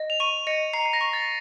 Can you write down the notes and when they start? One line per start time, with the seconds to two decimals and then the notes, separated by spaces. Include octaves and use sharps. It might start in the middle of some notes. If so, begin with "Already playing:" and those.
Already playing: D#5
0.10 F7
0.20 C#6 D#7
0.47 D#5 C#7
0.73 A#5 C7
0.86 C7
0.93 A#6
1.01 C#6
1.13 A6